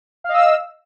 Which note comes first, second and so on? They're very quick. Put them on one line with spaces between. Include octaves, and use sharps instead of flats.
F5 D#5 E6